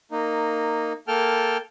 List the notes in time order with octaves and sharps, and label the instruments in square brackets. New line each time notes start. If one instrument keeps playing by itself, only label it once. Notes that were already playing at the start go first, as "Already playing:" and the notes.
[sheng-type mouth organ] A#3 D#4
A#3 A4 G5 A5 F6